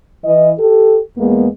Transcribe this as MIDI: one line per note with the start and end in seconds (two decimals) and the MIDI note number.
0.25 0.51 52
0.25 0.51 75
0.60 0.99 67
0.60 0.99 69
1.17 1.47 40
1.17 1.47 56
1.17 1.47 58
1.17 1.47 59